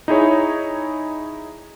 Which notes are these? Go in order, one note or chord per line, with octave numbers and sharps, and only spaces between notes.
D#4 E4 G#4 C#5